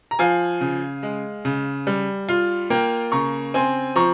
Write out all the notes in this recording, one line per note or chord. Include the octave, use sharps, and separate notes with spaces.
A#5
F3 F5 G#5
C#3
G#3
C#3
G3
F4
A#3 G5 A#5
C#3 A#5 C#6
C4 G#5 C6
F3 A#5 C#6